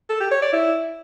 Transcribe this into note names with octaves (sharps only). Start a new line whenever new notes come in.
A4
G4
C#5
D5
E4